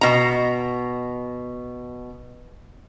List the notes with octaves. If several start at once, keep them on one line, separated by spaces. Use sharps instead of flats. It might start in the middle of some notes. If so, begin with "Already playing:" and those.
B2 A#5